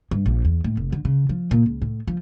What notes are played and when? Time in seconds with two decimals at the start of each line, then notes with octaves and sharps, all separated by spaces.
0.11 G2
0.26 A#1
0.45 E2
0.64 A2
0.77 F1
0.92 D3
1.05 C#3
1.29 F3
1.51 A#2
1.66 C#2
1.82 A2
2.07 F3